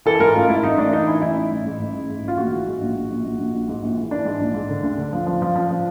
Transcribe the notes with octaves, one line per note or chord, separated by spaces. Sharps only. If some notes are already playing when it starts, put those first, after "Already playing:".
E3 A4
G#2 A#4
A1 F4
G#2 E4
A1 D#4
A1 D4
E3 D#4
E3 E4
A1 E4
A1
A1
G#2
A1
A1
G#2
A1 F4
A#1 F#4
E3
G#2
A#1
A#1
A#1
A#1
A#1
A#1
G#2
A#1
E3
E3 D4
G#2
A#1
G#2
D3
D2
D3
F3
F3
F3
F3
F3